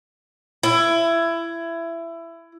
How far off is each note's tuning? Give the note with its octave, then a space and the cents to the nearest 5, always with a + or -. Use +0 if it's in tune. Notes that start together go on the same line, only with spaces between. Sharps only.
E4 +20